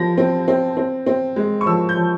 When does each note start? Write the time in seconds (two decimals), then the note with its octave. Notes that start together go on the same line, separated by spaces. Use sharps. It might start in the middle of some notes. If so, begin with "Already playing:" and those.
Already playing: F3 A#6
0.18 C4
0.48 C4
0.77 C4
1.06 C4
1.36 G#3
1.61 C#6
1.66 F3 E6
1.89 G6
1.96 F3